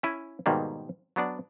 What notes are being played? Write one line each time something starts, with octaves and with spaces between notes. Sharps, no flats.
C#4 E4 G#5
G#2 B2 D#3 G3 A#3
F#3 B3 D4 D5